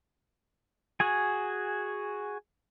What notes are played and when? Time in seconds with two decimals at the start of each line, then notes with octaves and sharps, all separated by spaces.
1.00 F#4 G#4 G#5